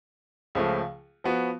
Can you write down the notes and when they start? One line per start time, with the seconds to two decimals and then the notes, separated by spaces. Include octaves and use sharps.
0.55 C#2 C#3 F3 A3
1.24 F3 B3 F#4